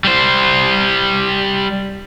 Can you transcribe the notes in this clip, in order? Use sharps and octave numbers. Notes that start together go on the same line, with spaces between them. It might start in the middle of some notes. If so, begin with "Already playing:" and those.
G3 C5